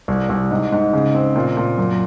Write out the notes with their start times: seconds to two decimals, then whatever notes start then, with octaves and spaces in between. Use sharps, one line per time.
0.08 C2
0.29 C2
0.51 G#2
0.72 G#2
0.93 C#3
1.15 C4
1.36 A#2
1.57 A#2
1.78 F#2